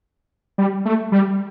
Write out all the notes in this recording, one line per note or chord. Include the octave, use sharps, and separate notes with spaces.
G3
A3
G3